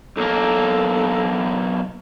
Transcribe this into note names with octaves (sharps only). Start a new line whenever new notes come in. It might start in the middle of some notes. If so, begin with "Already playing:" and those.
B1 A#3 A4